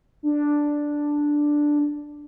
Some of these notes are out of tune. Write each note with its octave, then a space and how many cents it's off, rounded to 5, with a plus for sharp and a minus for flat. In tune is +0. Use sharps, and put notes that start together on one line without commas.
D4 +0